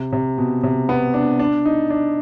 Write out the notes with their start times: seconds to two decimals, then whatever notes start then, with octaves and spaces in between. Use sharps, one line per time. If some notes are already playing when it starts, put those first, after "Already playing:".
Already playing: C3
0.12 C3
0.38 B2
0.63 C3
0.89 B3
1.14 D4
1.39 D4
1.66 D#4
1.90 D4